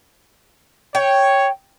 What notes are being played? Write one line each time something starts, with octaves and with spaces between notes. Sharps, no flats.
C#5 G5